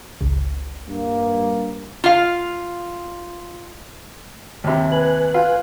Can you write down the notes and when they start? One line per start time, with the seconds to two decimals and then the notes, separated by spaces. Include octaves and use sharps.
0.21 G1 C#2
0.87 G2 A#3
2.04 F4 F5
4.64 D#2 C3
4.92 B4 G#5 F#6
5.34 F4